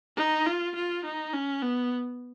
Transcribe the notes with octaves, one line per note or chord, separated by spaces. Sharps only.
D#4
F4
F4
D#4
C#4
B3